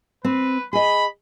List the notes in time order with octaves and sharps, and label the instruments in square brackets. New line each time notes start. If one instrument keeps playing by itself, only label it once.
[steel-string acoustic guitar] C4 [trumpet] B4
[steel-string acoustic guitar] G#4 D#5 [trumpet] B5